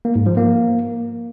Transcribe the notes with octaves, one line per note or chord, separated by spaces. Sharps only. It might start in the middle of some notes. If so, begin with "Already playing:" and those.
A#3
G#2
F3
A#3